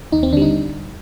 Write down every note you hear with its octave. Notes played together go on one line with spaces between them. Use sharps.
D#2 D#4
C4
D3 G3 D4
D#4